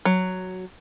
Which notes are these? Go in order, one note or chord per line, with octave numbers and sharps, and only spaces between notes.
F#3